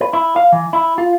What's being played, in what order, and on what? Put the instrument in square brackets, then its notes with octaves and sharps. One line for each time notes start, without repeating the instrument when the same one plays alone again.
[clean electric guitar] B4
E4
F5
E3
E4
F4